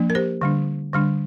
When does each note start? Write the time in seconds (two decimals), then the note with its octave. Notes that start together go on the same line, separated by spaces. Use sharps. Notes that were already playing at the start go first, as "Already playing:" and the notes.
Already playing: F3 A#3 D4
0.10 A#4
0.15 G4 C5
0.41 D3 G3 D4
0.93 D3 G3 D4